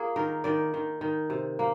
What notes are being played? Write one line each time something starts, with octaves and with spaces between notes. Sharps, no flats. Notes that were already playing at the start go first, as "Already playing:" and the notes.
Already playing: A#3 F4 G#4
D#3 A#4
D#3 D5
D#3
D#3
C3
A#3